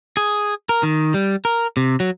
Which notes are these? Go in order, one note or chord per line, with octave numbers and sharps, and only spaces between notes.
G#4
A#4
D#3
G3
A#4
C3
F#3